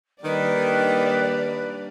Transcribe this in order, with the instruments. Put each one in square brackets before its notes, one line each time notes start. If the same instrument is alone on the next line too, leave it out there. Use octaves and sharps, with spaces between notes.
[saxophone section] D#3 [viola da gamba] G3 A#3 D4 [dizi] B4 [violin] D5